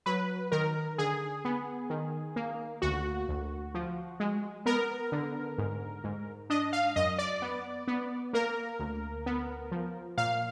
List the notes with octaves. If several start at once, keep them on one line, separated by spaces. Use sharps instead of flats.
F#3 B4
D#3 A#4
D3 G#4
B3
D#3
A#3
D2 F#4
D2
F3
G#3
B3 A#4
D3
G#2
G#2
D4 D#5
F5
F#2 D#5
D5
B3
B3
A#3 A#4
D2
B3
F3
A#2 F5